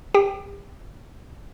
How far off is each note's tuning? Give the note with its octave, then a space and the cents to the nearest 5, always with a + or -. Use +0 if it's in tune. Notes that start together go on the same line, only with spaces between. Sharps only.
G4 +35 G5 +0